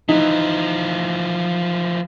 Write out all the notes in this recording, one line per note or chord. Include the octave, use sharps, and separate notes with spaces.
E3 F3 D#4